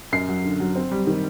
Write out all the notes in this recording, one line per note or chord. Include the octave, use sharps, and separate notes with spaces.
F#2 C7
F#3
D3
F#3
C4
G3
D#3